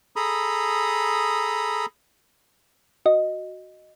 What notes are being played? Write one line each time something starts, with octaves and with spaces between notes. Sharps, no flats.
G#4 A4 A#5 B5 D#6
F#4 D#5